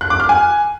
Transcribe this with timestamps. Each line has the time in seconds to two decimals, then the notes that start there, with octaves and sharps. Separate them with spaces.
0.01 F#6
0.10 D6
0.20 F6
0.29 G#5